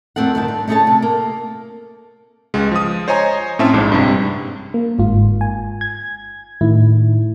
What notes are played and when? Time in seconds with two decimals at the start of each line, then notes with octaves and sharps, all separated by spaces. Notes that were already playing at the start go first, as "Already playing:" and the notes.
0.16 F2 A#2 A3 C4 A4 F#5
0.35 D2 G2 D#3 A5
0.48 D3
0.68 A3 C#4 G#4 A4 C#5 A5
0.87 C3
1.02 A#3
2.54 C#2 G#3
2.72 F3 D#6
3.08 C5 C#5 D#5 G#5 A#5
3.59 A2 C4 C#4 E5 A5 C6
3.73 A#1 G#2
3.92 G2 C3
4.74 A#3
4.98 G1 G#2 F4
5.41 G#5
5.81 G#6
6.61 A2 D#3 E4